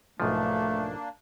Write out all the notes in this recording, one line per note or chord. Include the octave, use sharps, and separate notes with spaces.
B1 G#2 F3 A3 A#3 D4